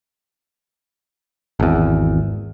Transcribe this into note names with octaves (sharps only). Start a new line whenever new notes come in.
G#1 E2